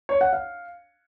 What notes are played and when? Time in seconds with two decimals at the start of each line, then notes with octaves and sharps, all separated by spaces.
0.09 C#5
0.21 F#5
0.33 F5